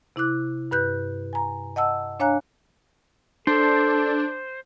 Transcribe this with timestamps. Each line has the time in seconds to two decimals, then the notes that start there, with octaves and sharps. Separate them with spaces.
0.16 C3 E4 D6 F#6
0.71 G2 B4 F#6 G6
1.33 G#5 A#5
1.76 D#5 F#5 A5 E6
2.20 D4 C#5 F5 G#5 A#5 F#6
3.47 D4 A4 C5